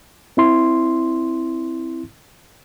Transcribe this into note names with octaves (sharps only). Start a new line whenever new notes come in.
C4 E4 C6